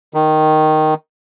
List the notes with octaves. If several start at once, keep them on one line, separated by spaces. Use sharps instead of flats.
D#3